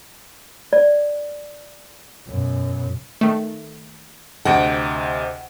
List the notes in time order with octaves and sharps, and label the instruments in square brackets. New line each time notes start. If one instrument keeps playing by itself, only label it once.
[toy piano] D5
[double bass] F#2 B2
[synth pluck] D#3 A3
[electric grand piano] D2 C3 D#5 [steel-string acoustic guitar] F#5 G5